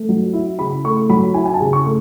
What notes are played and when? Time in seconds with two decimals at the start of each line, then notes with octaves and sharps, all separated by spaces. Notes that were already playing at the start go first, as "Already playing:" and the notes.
Already playing: A3
0.09 F#3
0.33 E4
0.59 C#3 B5
0.84 A3 C#6
1.09 F#3 B5
1.34 E4 G#5
1.46 G#5
1.54 A5
1.60 C#3
1.73 C#6
1.85 A3